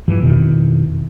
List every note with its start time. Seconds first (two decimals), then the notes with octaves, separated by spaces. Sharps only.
0.08 G2 E3 F3
0.22 F2 B2 D#3 E3